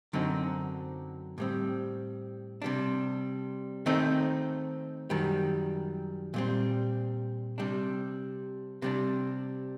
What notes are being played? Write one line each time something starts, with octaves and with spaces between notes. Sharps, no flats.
F#2 D3 F#3 C4 D#4
A2 G3 C4
C3 G3 D4
D#3 A3 C4 D#4
F#2 D#3 G3
A#2 G3 C4
C3 G3 D4
C3 G3 D4